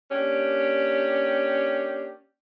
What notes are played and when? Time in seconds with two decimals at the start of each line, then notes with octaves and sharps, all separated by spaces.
0.11 A#3 C#4 D4 G4